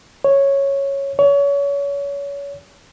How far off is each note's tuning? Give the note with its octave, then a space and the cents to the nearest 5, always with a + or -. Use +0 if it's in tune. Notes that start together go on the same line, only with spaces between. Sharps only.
C#5 -5
C#5 +30